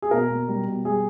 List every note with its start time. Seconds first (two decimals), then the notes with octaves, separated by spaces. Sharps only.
0.02 G#4
0.11 B2 A#4
0.30 B2
0.48 G3
0.67 B2
0.85 G3 G#4